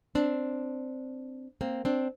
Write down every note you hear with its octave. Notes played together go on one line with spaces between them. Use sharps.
C4 D4
A#3 C4
C4 D4